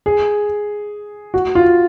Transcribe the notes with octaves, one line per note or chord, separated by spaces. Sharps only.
G#4
F#4
F4